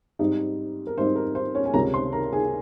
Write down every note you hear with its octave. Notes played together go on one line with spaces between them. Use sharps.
G#2 G3 C4 D#4
A#4
G#2 G3 C4 D#4 C5
A#4
C5
C#4 C#5
G#5
C#2 C3 G3 C#4 A#4 A#5
C5 C6
A#4 A#5
G#4 G#5